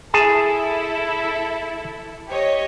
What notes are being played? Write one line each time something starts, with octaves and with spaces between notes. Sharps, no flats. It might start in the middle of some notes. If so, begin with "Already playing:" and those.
E4 G#4 A4 A5
G4 C#5 D#5